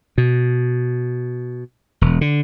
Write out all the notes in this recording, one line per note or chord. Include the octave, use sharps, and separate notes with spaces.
B2
E1
D3